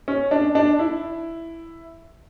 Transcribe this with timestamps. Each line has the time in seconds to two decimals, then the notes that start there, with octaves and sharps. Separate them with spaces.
0.08 C#4
0.31 D4
0.55 D4
0.79 E4